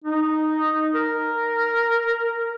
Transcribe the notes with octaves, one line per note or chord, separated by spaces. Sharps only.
D#4
A#4